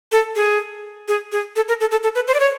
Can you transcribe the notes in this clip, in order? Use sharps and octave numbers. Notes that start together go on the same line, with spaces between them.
A4
G#4
G#4
G#4
A4
A#4
A4
A4
A4
B4
C5
D5
C#5